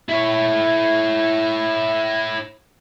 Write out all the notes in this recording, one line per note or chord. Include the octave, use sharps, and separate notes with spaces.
E4 C#5